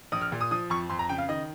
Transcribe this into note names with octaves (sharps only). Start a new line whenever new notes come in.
A#1 D#6
F6
A#2
D#6
F3 D#6
F2 C#6
F2 C6
A#5
C#3 G5
F5
D#3 D#5